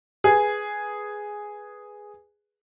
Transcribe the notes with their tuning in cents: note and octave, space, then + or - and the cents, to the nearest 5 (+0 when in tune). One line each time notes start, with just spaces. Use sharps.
G#4 +0 B4 +0